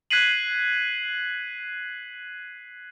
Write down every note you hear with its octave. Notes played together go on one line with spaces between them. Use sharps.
F#6 G#6 B6 C7 D#7 F#7